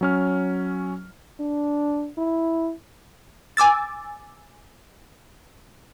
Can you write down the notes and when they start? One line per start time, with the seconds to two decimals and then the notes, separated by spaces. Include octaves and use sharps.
0.01 F#3 C#4 F6
1.40 D4
2.18 E4
3.57 G#5 D6 E6 A6